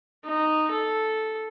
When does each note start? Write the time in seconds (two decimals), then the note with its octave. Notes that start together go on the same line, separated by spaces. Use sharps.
0.25 D#4
0.71 A4